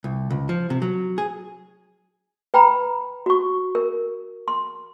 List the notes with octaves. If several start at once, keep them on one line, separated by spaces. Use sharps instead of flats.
C2
C#2
F3
C3
F#3
G#4
B4 G5 A#5 B5
F#4 C#6
A#4
C6